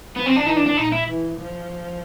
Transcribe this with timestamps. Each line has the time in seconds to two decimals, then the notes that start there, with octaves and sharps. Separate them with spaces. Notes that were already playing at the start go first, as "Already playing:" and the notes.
0.16 F3 B3
0.26 C4
0.36 D4
0.46 E3 D#4
0.57 D4
0.67 D4
0.77 A#2 D#4
0.92 E4
1.07 E3
1.38 F3